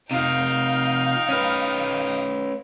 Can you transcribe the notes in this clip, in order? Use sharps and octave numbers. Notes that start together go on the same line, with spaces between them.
C3 D#4 F4 F5 G5
C#4 B4